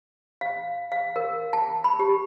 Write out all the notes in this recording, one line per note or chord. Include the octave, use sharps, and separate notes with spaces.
F5
F5
A#4
A5
B5
G4